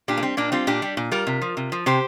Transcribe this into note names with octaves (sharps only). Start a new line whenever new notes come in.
A#2 D4 G4
A#3
G3 C4
A#2 A#3 D4
G3 C4 F4
A#2 D4 G4
G3
A#2
G3 F4 A#4
C3
F3
C3
F3
C3 G4 C5